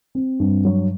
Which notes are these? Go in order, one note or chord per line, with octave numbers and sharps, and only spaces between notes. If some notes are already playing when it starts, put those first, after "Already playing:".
C4
G2
F#3